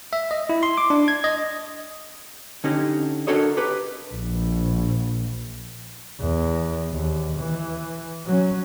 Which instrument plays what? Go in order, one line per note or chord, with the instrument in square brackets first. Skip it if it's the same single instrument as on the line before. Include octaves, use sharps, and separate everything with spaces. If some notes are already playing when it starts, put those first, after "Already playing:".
[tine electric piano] E5
D#5
E4
C6
D6
D4
G#6
D#5
[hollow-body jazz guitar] D3 C#4 D#4 G4
D4 F#4 A4 A#4 C#5 D#5
G4 B4
[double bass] A#1
E2
D#2
E3
F#3 C#4